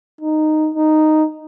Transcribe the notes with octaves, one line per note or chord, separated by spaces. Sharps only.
D#4
D#4